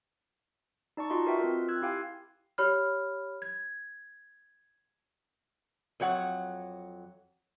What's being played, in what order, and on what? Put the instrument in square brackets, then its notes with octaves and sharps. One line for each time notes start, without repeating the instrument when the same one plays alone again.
[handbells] D#4 D5 A5 C#6
F4 F#4 D#5 C6
F#4 A#4 B4 D#5 E5 G5
C4 F4 A#4
E6 F#6 G#6
E4 G4 F5 G5 G#5 C6
[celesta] G4 C#5 B5 F6
G#6
[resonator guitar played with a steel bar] F2 F#3 C#5 F#5